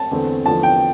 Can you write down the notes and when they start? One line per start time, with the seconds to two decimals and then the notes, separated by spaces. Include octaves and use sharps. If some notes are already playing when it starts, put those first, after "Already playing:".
Already playing: A5
0.11 E2 D3 A3 C4
0.46 E2 D3 F3 A3 A5
0.63 G5